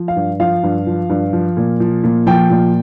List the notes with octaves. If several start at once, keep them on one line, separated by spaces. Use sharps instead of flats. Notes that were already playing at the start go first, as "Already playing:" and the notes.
Already playing: F3
F5
G2
F3 F5
G2
F3
G2
F3
A#2
F3
A#2
F3 G5
A#2